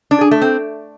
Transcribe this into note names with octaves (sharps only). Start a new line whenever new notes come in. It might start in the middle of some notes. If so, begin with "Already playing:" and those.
D4
G#4
A3
C4